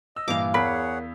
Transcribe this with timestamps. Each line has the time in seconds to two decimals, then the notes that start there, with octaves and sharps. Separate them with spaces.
0.16 D#5 E6
0.28 G2 A#2 E3 F5 D6
0.54 E2 G#4 A#4 C#5 F#5 B5 B6